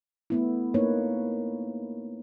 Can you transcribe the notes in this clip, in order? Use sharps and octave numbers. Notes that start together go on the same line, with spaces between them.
A3 B3 E4
A#3 B3 D#4 B4 C#5